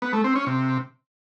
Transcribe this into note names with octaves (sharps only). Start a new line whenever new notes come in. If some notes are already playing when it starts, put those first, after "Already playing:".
B3
A3
C4
C#4
C3